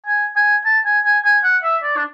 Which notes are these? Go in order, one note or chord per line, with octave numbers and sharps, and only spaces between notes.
G#5
G#5
A5
G#5
G#5
G#5
F#5
E5
D5
D4